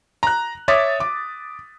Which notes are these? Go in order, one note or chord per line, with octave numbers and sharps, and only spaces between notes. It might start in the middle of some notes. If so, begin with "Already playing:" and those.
A#5 F#6
C#5 E5 D6 D#6 A6 B6
D6